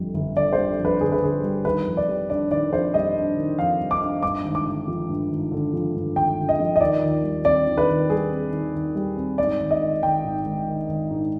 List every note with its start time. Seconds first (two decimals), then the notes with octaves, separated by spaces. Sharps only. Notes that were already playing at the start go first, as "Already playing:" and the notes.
Already playing: G1 F2 D3 G3
0.14 G1
0.36 D3 D5
0.53 C5
0.58 G3
0.79 F2
0.85 B4
1.01 G1 G#4
1.12 B4
1.22 D3 G#4
1.43 G3
1.65 D#3 B4
1.86 F2
1.97 D5
2.08 G3
2.29 D4 D5
2.51 D#3 D5
2.73 F2 C5
2.94 G3 D#5
3.15 D4
3.37 D#3
3.58 F2 F5
3.80 G3
3.91 D6
4.01 D4
4.23 G2 D6
4.44 G#1
4.55 D6
4.66 D3
4.88 F3
5.09 G2
5.30 G#1
5.52 D3
5.73 F3
5.95 G2
6.16 G#1 G5
6.38 D3
6.49 D#5
6.59 F3
6.76 D#5
6.80 D#3 D5
7.03 D#2
7.23 G3
7.45 C4 D5
7.67 D#3
7.78 B4
7.88 D#2
8.09 G3 G#4
8.31 C4
8.52 D#3
8.74 D#2
8.95 G3
9.17 C4
9.38 G#2 D5
9.60 G#1
9.71 D#5
9.81 D#3
10.03 G#1 G5
10.24 G#2
10.46 G#1
10.67 D#3
10.89 G#1
11.11 G#2